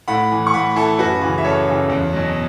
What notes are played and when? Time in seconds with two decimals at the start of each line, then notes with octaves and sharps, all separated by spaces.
0.08 A2 F#5 B5
0.31 E3
0.47 C#6
0.54 A2 F#5 B5
0.76 E3 E4 A4
0.99 F#2 F#4 B4
1.21 C#3 E3
1.38 E5
1.44 F#2 A4 C#5
1.68 C#3 E3
1.89 E2
2.13 B2 F#3